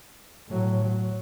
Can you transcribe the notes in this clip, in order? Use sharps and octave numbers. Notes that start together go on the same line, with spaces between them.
A2 F#3
F#3